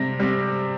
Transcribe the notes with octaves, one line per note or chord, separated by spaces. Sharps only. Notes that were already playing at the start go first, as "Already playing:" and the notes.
Already playing: C3 G3 C4 A#6
G3 C4